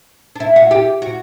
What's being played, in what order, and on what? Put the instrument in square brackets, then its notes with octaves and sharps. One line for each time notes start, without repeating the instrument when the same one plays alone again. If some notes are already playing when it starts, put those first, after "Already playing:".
[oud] D4
E4
F#4
G4
F#4